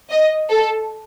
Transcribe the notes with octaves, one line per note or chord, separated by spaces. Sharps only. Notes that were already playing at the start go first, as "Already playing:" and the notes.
D#5
A4